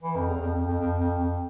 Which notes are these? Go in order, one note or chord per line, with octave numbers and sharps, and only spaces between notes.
E3
F2
E2
F2
F2
F2
F2
F2
F2